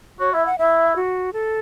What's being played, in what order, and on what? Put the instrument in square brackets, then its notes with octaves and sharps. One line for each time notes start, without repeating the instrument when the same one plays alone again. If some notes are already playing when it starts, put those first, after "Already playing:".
[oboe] F#4 [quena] C#5
[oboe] E4 [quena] E5
[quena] F#5
[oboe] E4 [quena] E5
[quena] F#4
A4